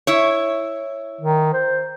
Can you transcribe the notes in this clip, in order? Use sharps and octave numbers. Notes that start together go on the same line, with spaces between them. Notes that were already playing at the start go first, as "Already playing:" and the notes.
E4 C#5
D#3
C5